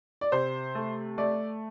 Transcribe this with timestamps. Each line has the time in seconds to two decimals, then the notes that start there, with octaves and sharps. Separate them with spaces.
0.21 D5
0.32 C3 C5
0.75 A3
1.18 A3 D5